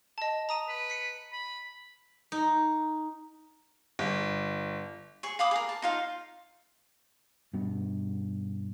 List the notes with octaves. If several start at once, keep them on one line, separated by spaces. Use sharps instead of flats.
D#5 A5
A#5 D#6 D#7
B4
B6 C#7
B5
D#4
G1
G#4 C#6
F5 B5 D6 D#6
G#4 A#4
A5
D#4 F4 F5
G2 B2